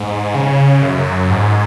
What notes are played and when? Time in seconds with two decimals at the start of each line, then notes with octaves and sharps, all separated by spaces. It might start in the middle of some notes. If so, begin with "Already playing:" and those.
Already playing: G#2
0.34 C#3
0.82 F#2
1.30 G#2